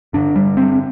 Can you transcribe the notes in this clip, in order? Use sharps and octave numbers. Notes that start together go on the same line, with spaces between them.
G2 D3 D4
G3
C4